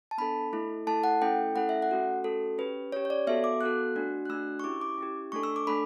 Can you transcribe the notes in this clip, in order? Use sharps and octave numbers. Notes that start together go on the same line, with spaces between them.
A5
B3 D4 A4 B5
A3 E4 A4
A3 E4 A4 A5
F#5
A3 C#4 E4 A4 G5
A3 C#4 E4 A4 F#5
E5
F#5
A3 C#4 F#4 A4
A3 C#4 F#4 A4
C#4 G4 B4
C#4 G4 C#5
C#5
D5
B3 F#4 A4 E5
D6
B3 F#4 A4 F#6
A3 D4 F#4
F#6
A3 D4 F#4 E6
C#6
C#4 E4 G4 D6
D6
C#4 E4 G4
A3 D4 A4 C#6
E6
D6
A3 D4 A4 B5